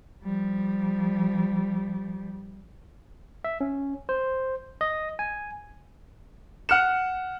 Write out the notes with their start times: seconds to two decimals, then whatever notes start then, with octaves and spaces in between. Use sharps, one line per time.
0.23 F3 G3
3.44 E5
3.61 C#4
4.09 C5
4.81 D#5
5.19 G#5
6.69 F#5 F6 F#6 C#7 E7